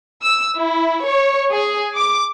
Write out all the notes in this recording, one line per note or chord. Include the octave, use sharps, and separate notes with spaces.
E6
E4
C#5
G#4
D6